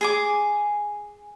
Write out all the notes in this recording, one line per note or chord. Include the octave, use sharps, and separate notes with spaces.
G#4 G#5 D6